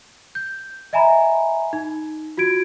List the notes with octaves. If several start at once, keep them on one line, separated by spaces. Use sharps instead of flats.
G6
D#5 E5 G#5 A#5 B5
D#4
F4 F#4 G#6 D7